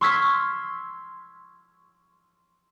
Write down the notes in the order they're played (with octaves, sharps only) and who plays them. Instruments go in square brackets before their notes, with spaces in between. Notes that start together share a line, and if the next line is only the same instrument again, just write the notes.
[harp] C6 C#6 E6 F6 G#6 B6